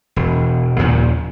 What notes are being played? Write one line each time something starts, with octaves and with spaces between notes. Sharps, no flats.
E1
D#2 A#2 C#3 F3